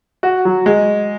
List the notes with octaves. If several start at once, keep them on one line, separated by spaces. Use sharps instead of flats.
F#4
F#3
G#3